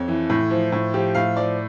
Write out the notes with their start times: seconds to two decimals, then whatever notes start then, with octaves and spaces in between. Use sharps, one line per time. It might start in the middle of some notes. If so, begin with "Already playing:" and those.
Already playing: F2 C#5
0.08 E3
0.30 A2
0.51 F3
0.72 A2
0.94 F3 G4
1.15 A2 F5
1.37 F3 D5